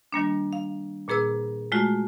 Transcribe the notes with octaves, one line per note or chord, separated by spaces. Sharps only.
D#3 G3 A#3 D4
F5
A#2 A#3 G#4 B4 E6
G#3 A3 F4 F#4